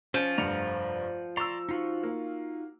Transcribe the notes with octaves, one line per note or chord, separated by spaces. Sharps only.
F3 C#4
F1 G2 F#5 A#5
D5 A#5 C6 C#6 E6
D#4 F4 F#4
A#3